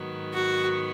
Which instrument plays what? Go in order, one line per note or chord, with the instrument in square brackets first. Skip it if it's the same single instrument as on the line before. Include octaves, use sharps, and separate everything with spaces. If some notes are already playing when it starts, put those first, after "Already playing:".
Already playing: [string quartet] G#2 D#3 F#3 B3
[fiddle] F#4